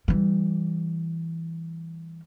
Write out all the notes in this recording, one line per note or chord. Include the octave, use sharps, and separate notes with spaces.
E3 G3